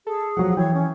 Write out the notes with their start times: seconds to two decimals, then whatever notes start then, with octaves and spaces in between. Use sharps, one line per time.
0.07 G#4 A4
0.37 F3 F#3 F#5
0.57 E3 C#5 G5
0.74 C#4